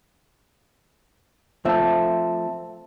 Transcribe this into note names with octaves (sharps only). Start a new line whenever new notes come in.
F3 A3 C4 E5 A5